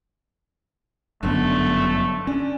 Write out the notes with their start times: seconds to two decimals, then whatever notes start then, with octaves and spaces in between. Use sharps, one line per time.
1.23 G1 F#2 D3 A3 B3
2.27 C#4 D4